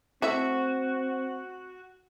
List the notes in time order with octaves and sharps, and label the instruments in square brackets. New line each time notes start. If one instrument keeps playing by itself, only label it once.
[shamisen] A3 E4 E5 [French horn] C4 [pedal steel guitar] F#4